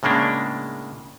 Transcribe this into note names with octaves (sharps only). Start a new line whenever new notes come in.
A2 C#3 G#3 A#3 D4